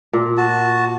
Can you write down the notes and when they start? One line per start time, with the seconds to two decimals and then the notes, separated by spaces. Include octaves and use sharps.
0.13 A#2
0.37 F#4 A5